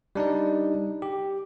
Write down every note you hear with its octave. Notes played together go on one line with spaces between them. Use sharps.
G3 D4 D#4 D5
G4